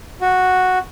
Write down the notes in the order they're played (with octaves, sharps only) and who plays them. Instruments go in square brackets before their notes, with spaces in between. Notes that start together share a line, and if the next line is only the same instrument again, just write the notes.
[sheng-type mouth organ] F#4